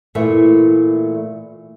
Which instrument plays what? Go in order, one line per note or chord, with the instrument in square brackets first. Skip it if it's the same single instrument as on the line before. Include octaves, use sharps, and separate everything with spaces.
[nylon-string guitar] A#2 E3 A3 E5